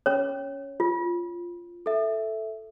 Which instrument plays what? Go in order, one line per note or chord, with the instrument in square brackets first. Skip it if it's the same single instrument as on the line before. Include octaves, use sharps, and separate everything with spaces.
[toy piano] C#4 C#5
F4
[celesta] A4 E5